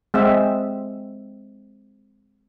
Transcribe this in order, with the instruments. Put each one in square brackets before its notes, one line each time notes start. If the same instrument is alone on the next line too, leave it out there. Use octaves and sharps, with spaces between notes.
[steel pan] G#3 C4 E5